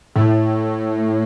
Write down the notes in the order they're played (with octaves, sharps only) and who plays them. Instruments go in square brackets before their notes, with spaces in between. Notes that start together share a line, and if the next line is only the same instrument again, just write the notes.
[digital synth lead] A2